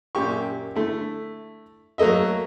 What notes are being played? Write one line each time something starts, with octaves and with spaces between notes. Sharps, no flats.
F#2 A#2 G4 C#6
D3 A3 E4
F#3 A3 A#3 D#5 E5